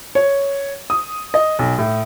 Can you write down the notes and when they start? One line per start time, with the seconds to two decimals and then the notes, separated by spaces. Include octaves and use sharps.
0.15 C#5
0.90 D#6
1.34 D#5
1.59 B1
1.78 A2